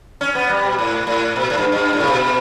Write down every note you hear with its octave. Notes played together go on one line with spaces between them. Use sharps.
C#4
B3
G3
B2
A2
A2
B2
A2
G2
G2
A2
C#3
B2